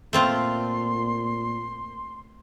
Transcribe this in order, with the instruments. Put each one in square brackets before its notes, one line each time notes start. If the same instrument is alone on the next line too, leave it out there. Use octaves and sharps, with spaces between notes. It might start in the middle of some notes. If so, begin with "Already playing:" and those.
[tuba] A#2 [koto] A3 C4 F4 [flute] C6